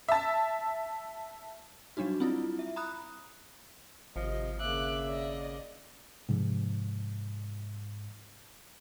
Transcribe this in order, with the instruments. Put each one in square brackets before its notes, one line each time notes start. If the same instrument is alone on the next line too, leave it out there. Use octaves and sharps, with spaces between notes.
[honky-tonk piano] E5 A5
[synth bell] F#3 G3 D4 D#4 F#4
C4 E4 F4
E5
A#5 B5 D#6 F#6
[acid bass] G#1 [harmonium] C3 D#5 [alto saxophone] F3
[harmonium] C#3 A#3 [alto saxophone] E5 [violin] D6 F#6
[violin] D5 D#5
[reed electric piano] G#2 [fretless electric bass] C3 F3